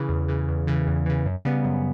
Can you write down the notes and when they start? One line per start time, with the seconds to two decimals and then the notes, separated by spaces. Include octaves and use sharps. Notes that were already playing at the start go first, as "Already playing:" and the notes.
Already playing: C#3 E3
0.09 E2
0.28 C#3 E3
0.48 E2
0.67 C#3 E3
0.87 E2
1.06 C#3 E3
1.26 F#2
1.45 C#3 G3 B3
1.65 F#2